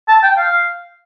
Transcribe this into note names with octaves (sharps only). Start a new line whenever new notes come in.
A5
G5
F5